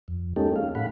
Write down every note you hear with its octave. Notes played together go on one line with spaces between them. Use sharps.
F2
G#3 A#3 C#4 D#4 G4 A4
F5
A2 F5 F#5 B5